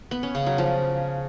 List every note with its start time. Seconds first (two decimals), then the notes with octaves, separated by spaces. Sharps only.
0.11 B3
0.23 C#4
0.35 C#3
0.46 F#3
0.58 F3